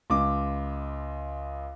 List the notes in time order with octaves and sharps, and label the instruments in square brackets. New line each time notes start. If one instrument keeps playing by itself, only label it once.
[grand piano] C#2 D6